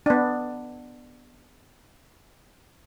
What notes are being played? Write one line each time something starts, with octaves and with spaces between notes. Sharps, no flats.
B3 D4